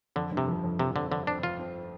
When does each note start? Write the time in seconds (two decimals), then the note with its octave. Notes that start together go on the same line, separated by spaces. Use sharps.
0.16 F2 D3
0.32 G1
0.37 C3
0.48 F3
0.64 F2
0.79 C3 F3
0.96 D3 C4
1.11 F2 D3
1.27 C4 D4
1.43 F3 F4
1.59 C4